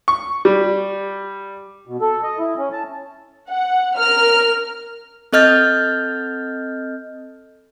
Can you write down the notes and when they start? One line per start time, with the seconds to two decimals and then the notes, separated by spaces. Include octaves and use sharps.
0.08 C#6
0.45 G3
1.88 B2
2.01 A4
2.23 D#5
2.39 E4
2.58 C#4
2.72 A5
3.50 F#5
3.98 A#4 F6
5.33 C4 A4 D#5 F6 G6 A6